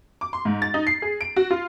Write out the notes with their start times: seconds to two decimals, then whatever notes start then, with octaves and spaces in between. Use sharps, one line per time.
0.21 D6
0.33 C6
0.45 G#2
0.62 A6
0.74 D#4
0.87 C7
1.02 G#4
1.21 D7
1.36 F#4
1.51 F4